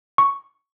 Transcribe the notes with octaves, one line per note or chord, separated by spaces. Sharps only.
C#6